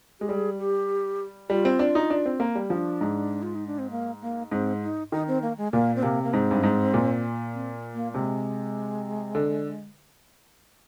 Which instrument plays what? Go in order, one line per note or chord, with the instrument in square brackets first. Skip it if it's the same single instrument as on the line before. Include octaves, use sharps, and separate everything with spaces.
[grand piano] G#3 [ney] G4
[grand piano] G3 [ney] G#4
[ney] G4
[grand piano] G3 [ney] F4
[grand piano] C4
D4
D#4
D4
C4
A#3
G3
[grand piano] F3 [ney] D4
[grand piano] G#2
[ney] F4
D#4
D4
C4
A#3
A#3
[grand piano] G#2 [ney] C4
[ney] D#4
[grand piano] D#3 [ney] D#4
[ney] C4
A#3
G#3
[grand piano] A#2 [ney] A#3
[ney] C4
[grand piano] C3 [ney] A#3
[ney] A#3
[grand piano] G#2 [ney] C4
[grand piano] G2
G#2
A#2
[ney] C4
A#3
[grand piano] C3 [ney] G#3
[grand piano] D3